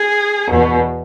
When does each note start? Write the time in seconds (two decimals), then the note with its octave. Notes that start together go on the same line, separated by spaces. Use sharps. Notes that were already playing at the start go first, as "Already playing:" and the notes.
Already playing: G#4
0.49 E2 B2